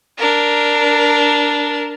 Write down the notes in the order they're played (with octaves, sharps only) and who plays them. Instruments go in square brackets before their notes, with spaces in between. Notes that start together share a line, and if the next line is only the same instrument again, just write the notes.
[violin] D4 A#4